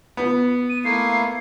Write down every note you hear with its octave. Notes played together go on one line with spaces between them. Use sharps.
B3
D#7
A3 A#3 E4 C7